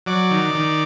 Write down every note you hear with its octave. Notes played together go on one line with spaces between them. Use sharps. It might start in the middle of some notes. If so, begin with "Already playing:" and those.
F#3 D5
D#3
D#3